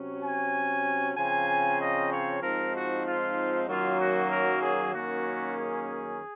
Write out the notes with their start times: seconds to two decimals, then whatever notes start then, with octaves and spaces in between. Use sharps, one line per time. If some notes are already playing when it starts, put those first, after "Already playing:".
Already playing: C3 F#3 C#4
0.22 G#5
1.16 C#3 F3 C4 G#5
1.79 D#5
2.10 C#5
2.42 G#2 F3 C4 D#4 A#4
2.73 F#4
3.05 F4
3.67 F#2 D#3 F#3 A#3 F4
3.99 F#4
4.30 A#4
4.62 G#4
4.93 F#2 D#3 A#3 C#4 F#4
5.56 G#4